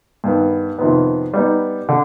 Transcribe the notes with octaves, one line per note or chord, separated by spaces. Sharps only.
G2 D#3 B3
F2 C3 D#3 B3
G3 B3 D#4
D3